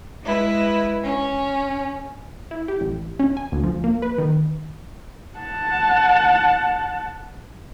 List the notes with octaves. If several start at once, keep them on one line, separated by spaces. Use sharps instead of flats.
G#3 E4 B4
C#4
E4
G4
A1
C#4
G#5
D2
F3
A#3
B4
D#3
F#5 A5